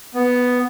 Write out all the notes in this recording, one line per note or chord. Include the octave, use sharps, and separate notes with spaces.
B3